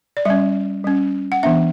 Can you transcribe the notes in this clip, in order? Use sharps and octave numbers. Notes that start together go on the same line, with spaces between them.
D5
G3 C#4 E5
G3 C#4
F#5
E3 B3 D4 E5